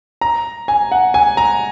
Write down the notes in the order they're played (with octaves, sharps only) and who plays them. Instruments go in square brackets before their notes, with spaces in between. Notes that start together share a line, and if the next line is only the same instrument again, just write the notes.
[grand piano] A#5
G#5
F#5
G#5
A#5